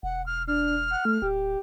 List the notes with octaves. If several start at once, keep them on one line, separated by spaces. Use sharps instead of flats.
E1 F#5
F6
D4 F6
F#5
A3
D1 G4